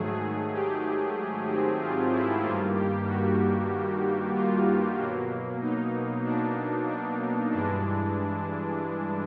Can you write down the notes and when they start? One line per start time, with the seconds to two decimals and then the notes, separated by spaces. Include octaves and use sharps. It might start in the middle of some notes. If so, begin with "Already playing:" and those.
Already playing: G#2 D#3 F#3 A3 G#4
0.53 G4
1.48 C4
1.80 F4
2.12 E4
2.43 G2 D#3 G3 A#3 F4
2.75 G4
3.07 F#4
4.34 F4
4.98 B2 F#3 A#3
5.61 D#4
6.25 D4
6.88 D4
7.52 G2 E3 G#3 D4